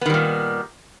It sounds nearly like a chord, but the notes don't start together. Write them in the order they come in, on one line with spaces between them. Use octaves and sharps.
B3 D#3 G3 A#2